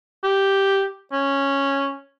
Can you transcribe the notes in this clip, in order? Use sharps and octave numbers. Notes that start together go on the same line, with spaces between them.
G4
C#4